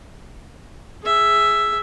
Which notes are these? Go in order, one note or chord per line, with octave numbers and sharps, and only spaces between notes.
G#4 E5